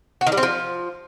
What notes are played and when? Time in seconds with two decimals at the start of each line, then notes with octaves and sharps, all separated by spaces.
0.21 F#4
0.27 D#3
0.32 G3
0.37 C4
0.43 F3